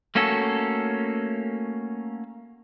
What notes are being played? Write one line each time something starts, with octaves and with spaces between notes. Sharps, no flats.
A3 A#3 C#4 F#4 A4